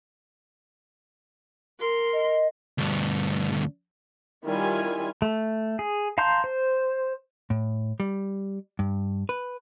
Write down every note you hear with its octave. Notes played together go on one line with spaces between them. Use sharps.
A#4 C6
D#5
D2 G2
D#3 G3 C#4 E4 F4 G#5
A3
G#4
F5 A5 A#5 C6 G6
C5
A2
G3
G2
B4